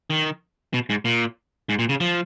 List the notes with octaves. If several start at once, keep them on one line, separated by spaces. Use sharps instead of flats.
D#3
B2
G#2
A#2
G#2
A#2
C#3
F3